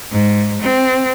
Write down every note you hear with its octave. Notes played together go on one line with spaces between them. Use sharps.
G#2
C4